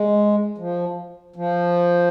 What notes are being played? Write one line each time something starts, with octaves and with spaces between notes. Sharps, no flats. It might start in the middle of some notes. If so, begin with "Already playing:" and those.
Already playing: G#3
F3
F3